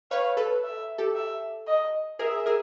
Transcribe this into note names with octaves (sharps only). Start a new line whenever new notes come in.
B4 C#5 F5
A4 B4
E5
G4 A4
E5
D#5
G#4 A#4 E5
G#4 A#4